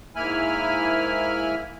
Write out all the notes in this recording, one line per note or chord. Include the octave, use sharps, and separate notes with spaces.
G#2 A#3 E4 G#5 B5 F6